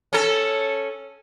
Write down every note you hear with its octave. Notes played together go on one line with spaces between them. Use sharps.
C#4 A4